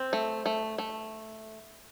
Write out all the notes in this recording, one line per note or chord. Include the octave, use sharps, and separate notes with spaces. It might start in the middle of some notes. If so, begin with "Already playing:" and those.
Already playing: C4
A3
A3
A3